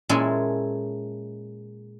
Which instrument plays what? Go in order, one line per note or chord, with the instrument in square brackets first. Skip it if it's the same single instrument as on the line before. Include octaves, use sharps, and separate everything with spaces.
[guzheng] A#2 G#3 C#4 E4 A4